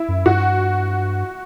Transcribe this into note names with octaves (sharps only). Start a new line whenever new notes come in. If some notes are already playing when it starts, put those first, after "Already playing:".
Already playing: E4
F#2
G2 F#4